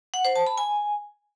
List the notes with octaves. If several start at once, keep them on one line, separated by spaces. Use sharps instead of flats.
F#5
C5
A5
B5
G#5